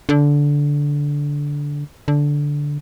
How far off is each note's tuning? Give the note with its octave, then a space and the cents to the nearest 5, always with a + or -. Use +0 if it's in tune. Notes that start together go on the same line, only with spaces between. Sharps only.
D3 -15
D3 -10